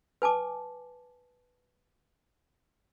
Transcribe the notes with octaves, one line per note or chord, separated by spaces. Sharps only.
B4 G#5 A5 D6